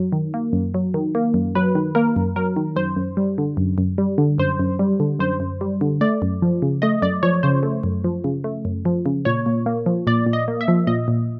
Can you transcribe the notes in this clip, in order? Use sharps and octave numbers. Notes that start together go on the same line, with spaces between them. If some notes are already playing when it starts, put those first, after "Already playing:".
Already playing: F#2 F#3
D#3
A#3
F#2
F#3
D#3
A#3
F#2
F#3 B4
D#3
A#3 A#4
F#2
F#3 A#4
D#3
F#2 C5
F#2
G3
D3
F#2
F#2
G3
D3
F#2 C5
F#2
G3
D3
F#2 C5
F#2
G3
D3
A3 D5
F#2
F3
C#3
A3 D#5
F#2 D5
F3 C#5
C#3 C5
A3
F#2
F3
C#3
A3
F#2
F3
C#3
A#2 C#5
A#2
A#3
F3
A#2 D5
A#2
D#5
A#3
E5
F3
A#2 D#5
A#2